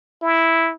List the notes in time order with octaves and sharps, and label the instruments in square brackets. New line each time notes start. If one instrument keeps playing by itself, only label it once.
[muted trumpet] E4